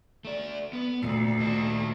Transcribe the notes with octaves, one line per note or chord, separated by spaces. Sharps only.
A3 D5
B3 B4
D2 A#2
A#2 D#3 D#5